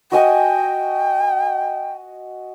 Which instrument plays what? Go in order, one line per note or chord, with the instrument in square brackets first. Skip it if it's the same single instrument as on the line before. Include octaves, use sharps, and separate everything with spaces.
[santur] F#4 D#5 G#5 [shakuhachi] G5